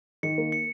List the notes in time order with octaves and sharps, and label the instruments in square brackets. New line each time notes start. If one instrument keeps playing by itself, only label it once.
[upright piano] D#3 [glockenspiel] C#7
[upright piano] A#3
[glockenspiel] C#7